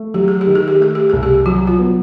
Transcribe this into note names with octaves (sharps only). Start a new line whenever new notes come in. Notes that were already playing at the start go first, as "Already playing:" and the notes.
Already playing: A3
F#3 G4
G#4
G4
D#3
G#4
G4
A3 G#4
G4
C2 G#4
G4
F#3 F#4
F4
B3